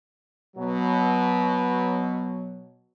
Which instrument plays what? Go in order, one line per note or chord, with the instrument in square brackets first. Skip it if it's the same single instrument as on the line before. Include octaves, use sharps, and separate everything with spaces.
[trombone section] B2 F#3